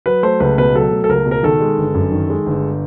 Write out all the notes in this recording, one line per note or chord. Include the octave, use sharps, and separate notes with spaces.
F#3 B4
A3 C5
C#2 B4
B2 B4
F#3 A4
A3
A4
C#2 A#4
B2
A#4
D#3 A4
G#3
G1
F#2
D#3
G#3
G1